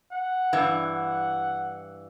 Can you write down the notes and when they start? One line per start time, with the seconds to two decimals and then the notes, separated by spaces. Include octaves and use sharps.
0.12 F#5
0.53 G2 E3
0.82 F#5